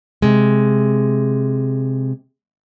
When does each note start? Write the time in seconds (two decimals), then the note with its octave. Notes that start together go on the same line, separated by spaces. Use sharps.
0.22 C3 G#3